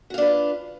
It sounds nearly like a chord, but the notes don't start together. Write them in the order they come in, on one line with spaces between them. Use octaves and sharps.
F#4 F5 D4 B4 F4